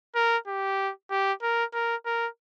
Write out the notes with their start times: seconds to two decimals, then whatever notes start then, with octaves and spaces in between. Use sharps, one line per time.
0.15 A#4
0.47 G4
1.11 G4
1.42 A#4
1.74 A#4
2.06 A#4